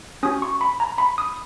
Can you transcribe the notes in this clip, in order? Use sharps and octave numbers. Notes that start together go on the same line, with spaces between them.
C#4 F#4 D#6
C#6
B5
A#5
B5
D#6